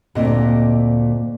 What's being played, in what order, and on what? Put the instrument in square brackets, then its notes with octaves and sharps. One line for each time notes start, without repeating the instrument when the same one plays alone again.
[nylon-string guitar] D2 A#2 C4 D#5